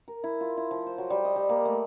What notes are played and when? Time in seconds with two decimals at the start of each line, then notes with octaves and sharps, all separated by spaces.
0.08 A#4
0.24 E4
0.41 F4
0.57 E4
0.71 F3
0.86 C5
0.98 F#3
1.10 G3
1.25 D#5
1.36 G3
1.49 A#3
1.65 A3